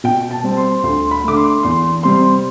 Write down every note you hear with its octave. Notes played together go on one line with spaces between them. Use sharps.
B2 G5
A5
G3 C4
C6
D2 C6
B5
D3 A3 D6
C6
E2 C6
C3 G3 C4 C6